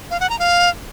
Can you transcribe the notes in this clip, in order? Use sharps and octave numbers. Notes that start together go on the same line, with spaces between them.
F5
F#5
A#5
F5